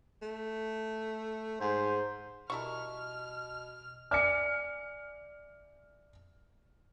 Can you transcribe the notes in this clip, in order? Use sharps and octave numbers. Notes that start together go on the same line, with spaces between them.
A3
G#2 C5
B2 G3 E4 A#4 C#6 F6
D5 E5 G#5 F6 C#7